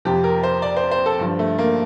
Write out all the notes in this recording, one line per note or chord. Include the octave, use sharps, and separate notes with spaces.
F2 C3 F3 G4
A#4
C5
D5
C5
C5
A4
G2 D3 F3
A3
A#3